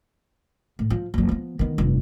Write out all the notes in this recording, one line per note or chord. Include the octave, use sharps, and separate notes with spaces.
A2
F3
F#1 F#3
F3 B3
D#3 B3
F1 G2